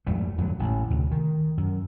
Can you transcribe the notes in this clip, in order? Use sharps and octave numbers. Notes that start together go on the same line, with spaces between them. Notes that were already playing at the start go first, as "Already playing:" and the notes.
F2 G#2 G3 A3
F2 G#2 D3 F#3
A1
D2 C3
D#3
F#2